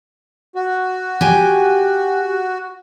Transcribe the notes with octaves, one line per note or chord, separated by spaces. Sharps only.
F#4
G4 G#5